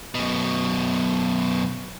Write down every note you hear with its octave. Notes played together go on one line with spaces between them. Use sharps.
F#2 B2